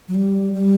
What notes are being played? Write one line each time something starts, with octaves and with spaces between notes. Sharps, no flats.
F#3
G3
G3